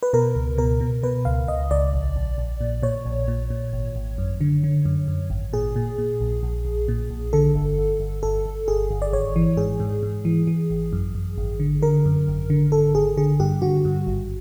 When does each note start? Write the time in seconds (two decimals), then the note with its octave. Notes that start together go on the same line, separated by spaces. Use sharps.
0.03 B4
0.13 B2 A#4
0.35 C#2
0.58 B2 A#4
0.81 B2
1.03 B2 B4
1.25 C#2 F5
1.48 C#2 D#5
1.71 C#2 D5
1.94 A#1
2.16 A#1
2.38 A#1
2.61 A#2
2.83 A#2 C#5
3.06 A#1
3.28 A#2
3.50 A#2
3.73 G#1
3.96 G#1
4.18 F#2
4.41 D3
4.64 D3
4.85 F#2
5.08 F#2
5.30 G#1
5.53 A#2 G#4
5.76 A#2
5.98 A#2
6.21 A#1
6.43 A#1
6.65 A#1
6.88 A#2
7.10 A#1
7.33 D3 A4
7.55 G1
7.77 G1
8.00 G1
8.23 G1 A4
8.46 G1
8.68 G1 G#4
8.91 G1
9.02 D5
9.13 G#1 C#5
9.36 E3
9.57 G#2 G#4
9.80 G#2
10.03 G#2
10.25 E3
10.47 E3
10.70 G#1
10.93 F#2
11.15 F#2
11.38 G#1
11.60 D3
11.82 D3 A#4
12.05 F#2
12.27 G#1
12.50 D3
12.72 G#1 A4
12.95 G#1 G#4
13.17 D3 G#4
13.40 G2 G4
13.62 D3 F#4
13.85 G2
14.07 G#1